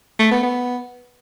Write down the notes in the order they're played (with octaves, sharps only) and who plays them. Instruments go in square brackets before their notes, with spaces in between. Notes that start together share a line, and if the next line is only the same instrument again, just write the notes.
[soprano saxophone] A3
B3
B3